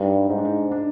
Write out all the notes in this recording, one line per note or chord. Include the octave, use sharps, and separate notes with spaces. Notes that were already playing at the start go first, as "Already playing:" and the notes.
Already playing: G2 D#4
G#2 D#4
D4
D#4
D4